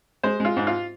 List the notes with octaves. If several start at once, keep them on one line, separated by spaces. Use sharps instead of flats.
G#3 C5
G#3 F4
G#2
F4